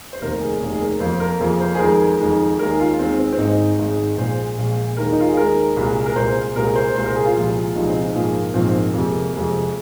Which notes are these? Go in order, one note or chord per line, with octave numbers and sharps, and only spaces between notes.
C5
F1 D#2 D#3 A#4
G#4
F1 D#2 D#3 G#4
G#4
A#4
F2 F3 A#3 C5
A#4
F2 F3 A#3 G#4
C5
G#4
F2 D#3 G#3 A#4
F2 D#3 G#3
D#2 D#3 G#3 A#4
G#4
F4
D#2 D#3 G#3 C4
C4
C4
G#1 G#2 D#3 G#3 D#4
G#1 G#2 D#3 G#3
A#1 A#2 G#3 C5
A#1 A#2 G#3
D#2 D#3 G#3 A#4
D#4
F4
G#4
D#2 D#3 G#3 A#4
C2 A#2 G#3
A#4
C2 A#2 G#3 C5
C2 A#2 G#3 A#4
C5
C2 A#2 G#3 C5
A#4
G#4
F4
C2 A#2 F3 G#3
C2 A#2 F3 G#3 D#4
C4
D#4
A#1 G#2 F3 A#3 G#4
A#1 G#2 F3 A#3 C4
F2 C3 G#3 A#3
F2 C3 G#3